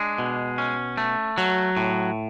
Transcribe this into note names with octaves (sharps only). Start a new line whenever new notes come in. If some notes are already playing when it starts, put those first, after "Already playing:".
Already playing: G#3 D4
B2
C#4
A3
F#3
A2